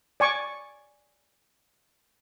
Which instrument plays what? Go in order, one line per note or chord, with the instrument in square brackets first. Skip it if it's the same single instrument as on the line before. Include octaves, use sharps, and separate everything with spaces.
[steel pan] D5 G#5 C#6 D6